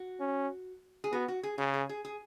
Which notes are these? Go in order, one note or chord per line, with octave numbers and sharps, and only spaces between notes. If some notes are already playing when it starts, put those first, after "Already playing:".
Already playing: F#4
C#4
G#4
B3 F#4
F#4
G#4
C#3 G#4
G#4
G#4
G#4